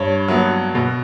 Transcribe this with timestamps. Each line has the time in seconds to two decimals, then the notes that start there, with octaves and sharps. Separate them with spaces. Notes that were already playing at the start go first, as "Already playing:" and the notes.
Already playing: G2 C#5
0.28 F#3 B3
0.75 B2